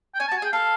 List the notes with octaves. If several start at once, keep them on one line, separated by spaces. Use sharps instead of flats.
G5
C#4 G#5
A5
F#4
G#5
G#4 G5
A4 F5